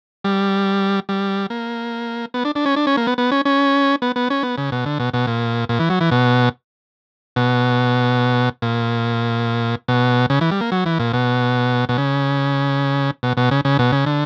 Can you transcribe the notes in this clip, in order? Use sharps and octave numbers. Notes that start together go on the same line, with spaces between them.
G3
G3
A#3
B3
D4
D4
C#4
D4
C#4
A#3
B3
B3
C#4
C#4
B3
B3
C#4
B3
C#3
B2
D3
B2
B2
A#2
A#2
E3
F#3
E3
B2
B2
A#2
B2
C#3
E3
G3
A#3
F#3
E3
A#2
B2
B2
C#3
B2
B2
C#3
C#3
B2
C#3
D3